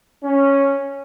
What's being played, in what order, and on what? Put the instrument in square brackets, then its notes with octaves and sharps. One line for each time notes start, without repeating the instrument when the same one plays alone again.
[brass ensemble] C#4